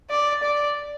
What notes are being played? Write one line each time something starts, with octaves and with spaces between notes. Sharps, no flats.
D5
D5